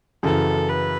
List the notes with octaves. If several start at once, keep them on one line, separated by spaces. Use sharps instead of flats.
F#2 C#3 E3 A4
B4